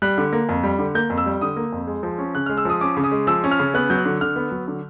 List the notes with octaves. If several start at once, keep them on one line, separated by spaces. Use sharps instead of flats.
G3 F#6
D3
A#3
F2
G3
D3
A#3 G6
F2
E6
G3
D3 D#6
A#3
F2
G#3
F3
C#4
C#3 F#6
G#3 F6
E6
F3 D#6
C#4 D6
C#3
D#6
G#3
F3 E6
C#4
F6
C#3
B3 F#6
F#3 G6
F#6
D3
D3 F6
B3
F#3
D3